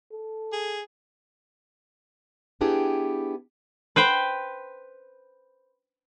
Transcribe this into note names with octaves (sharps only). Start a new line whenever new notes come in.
A4
G#4
B3 D4 E4 G4 G#4 G5
B4 C5 G5